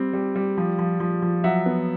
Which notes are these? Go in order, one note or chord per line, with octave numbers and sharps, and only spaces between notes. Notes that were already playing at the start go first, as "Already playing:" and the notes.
Already playing: G3 C4
G3
G3
F3
F3
F3
F3
F#3 E5 F#5
B3